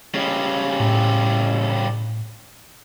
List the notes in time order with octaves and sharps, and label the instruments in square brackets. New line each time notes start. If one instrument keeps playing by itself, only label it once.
[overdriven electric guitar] C#3 G3
[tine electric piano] A2